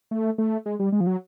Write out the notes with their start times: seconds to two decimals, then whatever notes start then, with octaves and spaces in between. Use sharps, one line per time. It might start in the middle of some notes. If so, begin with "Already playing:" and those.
0.11 A3
0.38 A3
0.66 G#3
0.80 G3
0.92 G#3
1.01 F3
1.07 F#3